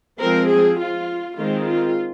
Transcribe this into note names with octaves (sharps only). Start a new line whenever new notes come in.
F3 G#3 C4 A#4
G#4
F4
D#3 G#3 C4 F4
F4